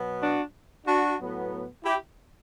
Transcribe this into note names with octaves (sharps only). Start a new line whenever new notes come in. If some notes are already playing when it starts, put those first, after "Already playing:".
Already playing: B2 F#3 B3
D4 F#4
D4 F#4
A2 F#3 B3
E4 G4